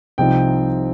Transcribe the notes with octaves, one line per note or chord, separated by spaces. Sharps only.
C2 C3 F3 C4 D#4 G5